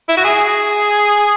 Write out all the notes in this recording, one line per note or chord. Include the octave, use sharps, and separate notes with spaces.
E4
F#4
G#4